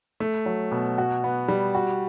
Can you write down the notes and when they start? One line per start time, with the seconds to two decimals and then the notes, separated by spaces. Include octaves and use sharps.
0.20 A3
0.46 F#3
0.71 B2
0.98 F#4
1.24 B3
1.48 G3
1.75 F#4